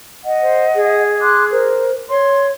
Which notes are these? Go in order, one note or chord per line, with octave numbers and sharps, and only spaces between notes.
D#5 F#5
C5
G#4
C6 D6 F#6
A#4 C5
C#5 C6